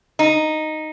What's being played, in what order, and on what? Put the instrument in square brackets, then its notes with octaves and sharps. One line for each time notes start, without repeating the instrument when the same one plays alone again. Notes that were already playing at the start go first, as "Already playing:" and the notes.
[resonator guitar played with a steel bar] D#4